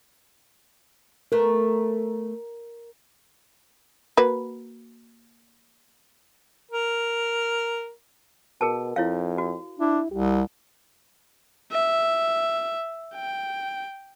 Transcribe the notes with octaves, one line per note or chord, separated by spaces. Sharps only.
A3 B3 A#4
A#3 F#4 B4
A#4
B2 G#4 A#4 A5
F2 E4 C#5 F5
F#4
D4 E4
C2 G4
E5
G5